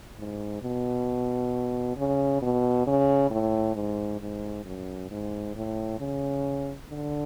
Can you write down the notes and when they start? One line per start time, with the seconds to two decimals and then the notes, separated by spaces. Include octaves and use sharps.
0.19 G#2
0.62 B2
1.97 C#3
2.42 B2
2.87 C#3
3.31 A2
3.75 G#2
4.21 G#2
4.65 F#2
5.11 G#2
5.55 A2
5.99 C#3
6.90 D3